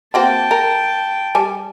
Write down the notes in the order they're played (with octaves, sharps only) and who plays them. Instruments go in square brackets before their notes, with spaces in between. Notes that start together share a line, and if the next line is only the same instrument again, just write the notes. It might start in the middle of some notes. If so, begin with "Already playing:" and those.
[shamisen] A#3 C4 F#4 [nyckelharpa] G5 A5
[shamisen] A#4
G3 G#5 A5